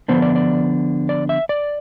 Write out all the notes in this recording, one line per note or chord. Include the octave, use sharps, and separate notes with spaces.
D3 F3 B3 D4 C5
D5
D5
D5
E5
D5